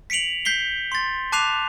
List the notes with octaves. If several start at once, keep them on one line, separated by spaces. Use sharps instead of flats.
B6 C#7 D7 F7 F#7
G6 B6 C7 G7
C6 A6
A5 D6 F#6 C7 D#7 F7